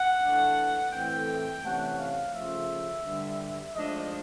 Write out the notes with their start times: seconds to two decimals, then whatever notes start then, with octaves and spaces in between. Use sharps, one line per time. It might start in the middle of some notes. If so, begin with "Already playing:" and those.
Already playing: F#5
0.22 E3 A3 D4
0.93 A2 E3 A3 C4 G5
1.63 C3 E3 A3 C#4 F#5
1.98 F5
2.34 C#3 F3 A3 E5
3.04 G2 D3 G3
3.73 G#2 F3 A3 D4 D#5